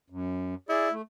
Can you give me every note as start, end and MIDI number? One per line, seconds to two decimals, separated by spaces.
0.10 0.55 42
0.69 0.92 64
0.69 0.88 68
0.69 0.88 74
0.92 1.02 57